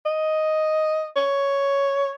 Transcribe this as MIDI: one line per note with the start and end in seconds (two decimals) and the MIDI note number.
0.05 1.08 75
1.16 2.15 73